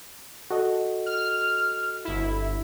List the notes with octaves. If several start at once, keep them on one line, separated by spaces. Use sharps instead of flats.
F#4 A4 D#5
F6
G1 E4